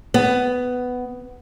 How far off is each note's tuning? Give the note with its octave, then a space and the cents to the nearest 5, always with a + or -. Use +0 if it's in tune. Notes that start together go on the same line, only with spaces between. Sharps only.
B3 +10